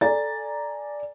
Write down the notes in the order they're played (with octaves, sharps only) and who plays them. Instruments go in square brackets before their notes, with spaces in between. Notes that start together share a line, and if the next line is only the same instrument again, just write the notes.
[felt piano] A4 D5 G#5 A#5 A6